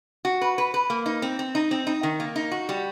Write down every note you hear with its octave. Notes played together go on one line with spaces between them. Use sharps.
F#4
B4
B4
B4
A#3
D#4
C4
C4
D#4
C4
D#4
D#3
A#3
D#4
F#4
G3